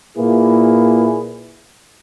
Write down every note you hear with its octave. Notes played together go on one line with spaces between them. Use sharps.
A#2 A#3 E4 G#4 B4